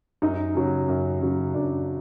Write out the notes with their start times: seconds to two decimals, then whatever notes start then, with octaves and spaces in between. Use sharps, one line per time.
0.22 F#2 D#4 D#5
0.55 C#3 F#3
0.88 F#2
1.22 C#3 F#3
1.54 F#2 D4 D5